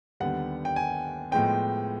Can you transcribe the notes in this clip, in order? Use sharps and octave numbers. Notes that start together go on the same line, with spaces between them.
D#2 D3 G3 B3 F#5
G5
G#5
A2 F3 G#3 B3 G5